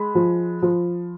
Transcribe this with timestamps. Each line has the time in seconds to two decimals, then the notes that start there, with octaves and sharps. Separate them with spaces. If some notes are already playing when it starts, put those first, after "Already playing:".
Already playing: G#3 B5
0.15 F3
0.62 F3